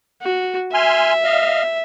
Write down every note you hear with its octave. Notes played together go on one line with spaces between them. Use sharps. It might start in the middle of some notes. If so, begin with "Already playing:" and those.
F#4
E5 G#5 C6 F6
D#5 F5 F6